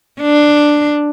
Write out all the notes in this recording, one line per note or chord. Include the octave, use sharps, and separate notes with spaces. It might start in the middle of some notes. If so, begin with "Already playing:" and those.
D4